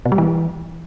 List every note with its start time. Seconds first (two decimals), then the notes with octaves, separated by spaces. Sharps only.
0.06 B2
0.12 G3
0.18 E3